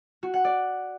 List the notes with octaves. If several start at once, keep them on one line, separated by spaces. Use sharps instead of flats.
F#4
F#5
D5